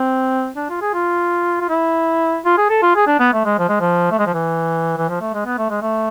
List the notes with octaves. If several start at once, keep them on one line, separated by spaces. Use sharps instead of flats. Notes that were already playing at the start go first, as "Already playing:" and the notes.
Already playing: C4
D4
F4
G#4
F4
F4
E4
F4
G#4
A4
F4
G#4
D4
B3
A3
G#3
F3
G#3
F3
A3
G#3
F3
E3
E3
F3
A3
G#3
B3
A3
G#3
A3